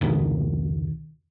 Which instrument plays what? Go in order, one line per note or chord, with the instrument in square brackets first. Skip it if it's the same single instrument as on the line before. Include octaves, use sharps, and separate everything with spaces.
[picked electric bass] F1 C#2 B2 D#3